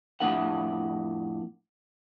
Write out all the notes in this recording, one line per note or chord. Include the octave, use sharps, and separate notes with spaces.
F2 A2 A3 D4 A#4 F#5